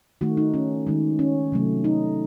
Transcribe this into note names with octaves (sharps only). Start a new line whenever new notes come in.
D#3 A3 F#4
D#4
C#4
D#3 G#3
C#4
C3 F#3 A3
D#4